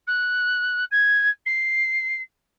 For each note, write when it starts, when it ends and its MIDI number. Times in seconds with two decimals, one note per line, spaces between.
0.07 0.84 90
0.91 1.30 92
1.46 2.22 96